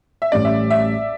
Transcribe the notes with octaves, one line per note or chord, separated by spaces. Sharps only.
E5
A1 A2 G3 C#4 D5
E5
E5